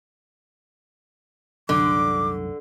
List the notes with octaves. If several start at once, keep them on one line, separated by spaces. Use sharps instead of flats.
C2 F#2 D3 F#3 D6